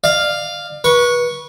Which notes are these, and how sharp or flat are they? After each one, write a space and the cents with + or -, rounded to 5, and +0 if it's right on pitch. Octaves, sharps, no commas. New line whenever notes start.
D5 +35 F5 +0
B4 -30 C#6 +0